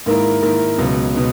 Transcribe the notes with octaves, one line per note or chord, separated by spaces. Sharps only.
G#2 D#3 A#3 E4 A#4
G#2 D#3 A#3 E4 A#4
C#2 B2 F#3
B2